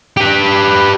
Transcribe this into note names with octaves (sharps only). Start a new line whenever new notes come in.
G4 B4